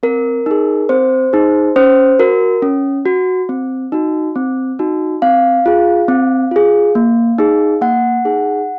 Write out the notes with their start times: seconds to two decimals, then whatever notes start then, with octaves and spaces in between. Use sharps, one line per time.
0.03 C4 A#4
0.46 D#4 G#4
0.89 C4 C5
1.33 D#4 G#4
1.76 C#4 C5
2.19 F#4 A#4
2.62 C#4
3.06 F#4
3.49 C4
3.92 D#4 F#4
4.36 C4
4.79 D#4 F#4
5.22 C4 F5
5.66 F4 G#4
6.08 C4
6.51 F4 G#4
6.95 A#3
7.38 D#4 G#4
7.81 A#3 F#5
8.25 D#4 G#4